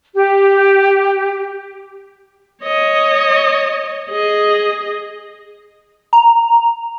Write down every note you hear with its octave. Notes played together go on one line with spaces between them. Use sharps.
G4
C#5 D#5
G#4 D#5
A#5